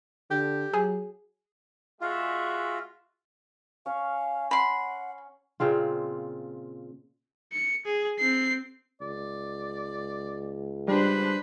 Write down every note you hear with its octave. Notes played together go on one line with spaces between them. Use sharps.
D3 G4
F#3 G#4 G#5
G#3 F4 F#4 E5
C#4 C#5 F5
F#5 B5 C6
A#2 C#3 C4 F4
C#7
G#4
C4 C7
C#2 D5
G3 D4 B4 C5